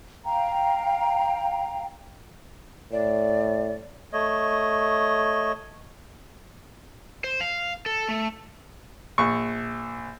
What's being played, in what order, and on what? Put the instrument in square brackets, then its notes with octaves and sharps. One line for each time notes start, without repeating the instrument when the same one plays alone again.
[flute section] F5 G5 A#5
[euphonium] A2 [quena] D5
[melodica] A3 C#5 D#5
[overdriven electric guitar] C5
F5
A4
A3
[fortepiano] A#1 C#6